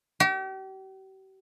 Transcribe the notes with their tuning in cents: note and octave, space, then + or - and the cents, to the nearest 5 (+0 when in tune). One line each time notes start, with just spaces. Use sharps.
G4 -40